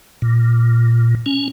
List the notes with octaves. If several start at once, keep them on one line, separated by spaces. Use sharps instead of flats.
A#2
C#4